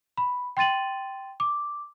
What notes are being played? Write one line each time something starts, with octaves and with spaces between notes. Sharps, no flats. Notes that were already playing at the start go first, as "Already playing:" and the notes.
B5
G5 C6 A6 D#7 F#7
D6